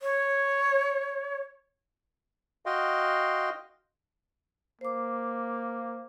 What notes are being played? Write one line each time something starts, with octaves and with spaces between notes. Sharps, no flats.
C#5
F#4 D#5 F5 G5 C6
A#3 C5 D6